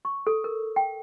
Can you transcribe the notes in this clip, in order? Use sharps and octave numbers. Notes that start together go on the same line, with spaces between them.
C#6
A4
A#4
G5